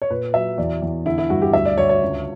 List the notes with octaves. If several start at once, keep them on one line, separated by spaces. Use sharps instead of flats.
C#5
A#2 B4
F#3 E5
E2 D5
E2
D3 E4
E4
G2 F#4
G4
D2 E5
D5
D2 C#5
C#5
C#2